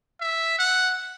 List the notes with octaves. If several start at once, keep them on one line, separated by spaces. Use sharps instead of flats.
E5
F#5